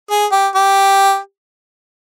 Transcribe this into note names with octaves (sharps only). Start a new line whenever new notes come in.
G#4
G4
G4